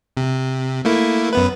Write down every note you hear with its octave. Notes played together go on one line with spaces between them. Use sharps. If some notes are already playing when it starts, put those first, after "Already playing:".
C3
A3 A#3 E4
F#2 B3 B4